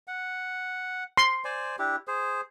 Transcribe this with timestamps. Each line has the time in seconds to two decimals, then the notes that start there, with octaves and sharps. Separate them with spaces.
0.08 F#5
1.17 C6
1.45 C5 D5 G#5
1.79 D4 E4 G4
2.08 G#4 C5